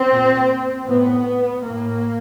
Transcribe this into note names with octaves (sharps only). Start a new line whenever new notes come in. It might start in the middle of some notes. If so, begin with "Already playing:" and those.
Already playing: C4
A#2
A2 B3
A2 A#3